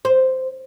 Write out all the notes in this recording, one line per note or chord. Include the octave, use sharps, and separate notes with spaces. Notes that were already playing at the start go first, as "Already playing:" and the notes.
C5